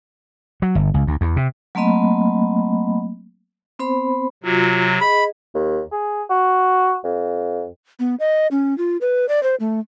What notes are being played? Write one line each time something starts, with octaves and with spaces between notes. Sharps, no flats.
F#3
G1
C#2
D2
E2
C3
F#3 A3 A#3 C4 D#5 B5
B3 C4 C5 B5
C3 F#3 F4 F#4
G#4 D#5 B5
D#2
G#4
F#4
F2
B3
D#5
C#4
F4
B4
D5
C5
A3